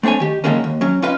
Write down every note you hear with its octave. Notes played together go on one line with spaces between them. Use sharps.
A3 C4 D4 C#5 G#5
D#3 G4
D3 D#3 F#3 G#3 A#3 C#4
D#2
F#3 C#4
C#4 D#4 F4 B4 F5